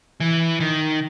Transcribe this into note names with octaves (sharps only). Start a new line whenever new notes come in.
E3
D#3